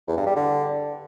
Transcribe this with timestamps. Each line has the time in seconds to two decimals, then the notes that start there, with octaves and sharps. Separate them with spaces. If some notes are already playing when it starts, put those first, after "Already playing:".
0.08 E2
0.17 G2
0.26 G3
0.36 D3